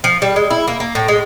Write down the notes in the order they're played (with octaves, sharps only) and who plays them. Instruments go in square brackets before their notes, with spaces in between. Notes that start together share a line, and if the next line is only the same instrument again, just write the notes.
[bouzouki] F3
G3
G#3
E4
A#3
A#3
A2
G#3